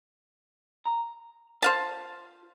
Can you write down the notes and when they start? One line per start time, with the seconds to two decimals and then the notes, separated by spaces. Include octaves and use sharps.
0.85 A#5
1.62 F4 C5 F5 A5